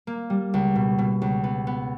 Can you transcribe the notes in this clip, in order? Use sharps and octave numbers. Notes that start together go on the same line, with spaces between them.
A#3
G3
C#2
B2
B2
C#2
B3
B3